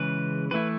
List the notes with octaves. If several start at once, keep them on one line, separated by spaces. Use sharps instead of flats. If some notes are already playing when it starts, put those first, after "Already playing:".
Already playing: C#3 E3 G#3 B4
E3 A3 E4 B4